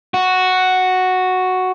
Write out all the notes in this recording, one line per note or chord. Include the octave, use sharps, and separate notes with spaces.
F#4